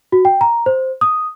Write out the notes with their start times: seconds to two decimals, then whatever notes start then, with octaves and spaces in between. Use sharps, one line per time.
0.12 F#4
0.25 G5
0.41 A#5
0.66 C5
1.01 D#6